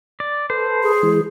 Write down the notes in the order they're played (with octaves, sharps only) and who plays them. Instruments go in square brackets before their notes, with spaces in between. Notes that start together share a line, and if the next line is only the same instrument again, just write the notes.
[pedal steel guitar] D5
[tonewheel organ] A4 B4 [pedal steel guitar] C5
[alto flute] G#4
[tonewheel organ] E3 G#3